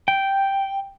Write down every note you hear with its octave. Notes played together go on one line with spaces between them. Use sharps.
G5